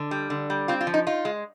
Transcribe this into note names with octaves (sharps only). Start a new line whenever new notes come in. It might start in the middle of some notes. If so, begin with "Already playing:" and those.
Already playing: D3
G3
D3
G3
C4 F4
F4
F3
D#4
D#4 F4
G#3